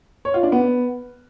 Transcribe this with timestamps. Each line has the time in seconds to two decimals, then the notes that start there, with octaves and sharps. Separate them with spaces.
0.25 C#5
0.34 F4
0.43 D4
0.52 B3